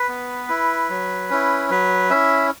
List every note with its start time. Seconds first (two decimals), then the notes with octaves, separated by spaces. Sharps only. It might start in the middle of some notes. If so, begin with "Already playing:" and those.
Already playing: B4
0.09 B3
0.49 E4
0.89 F#3
1.30 C#4 E4
1.70 F#3 B4
2.10 C#4 E4 E5